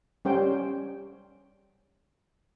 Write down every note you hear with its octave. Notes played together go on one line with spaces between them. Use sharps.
G3 C#4 C5 G5